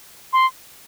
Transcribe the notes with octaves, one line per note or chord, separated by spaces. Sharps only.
C6